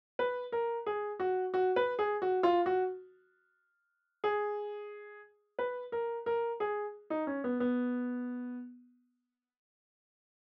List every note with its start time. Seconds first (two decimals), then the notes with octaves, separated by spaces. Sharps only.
0.19 B4
0.52 A#4
0.86 G#4
1.20 F#4
1.54 F#4
1.76 B4
1.99 G#4
2.22 F#4
2.43 F4
2.66 F#4
4.24 G#4
5.59 B4
5.92 A#4
6.26 A#4
6.60 G#4
7.10 D#4
7.27 C#4
7.44 B3
7.60 B3